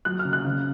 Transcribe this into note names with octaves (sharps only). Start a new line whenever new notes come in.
F#3 F#6
F6
C#3
F#6
C#3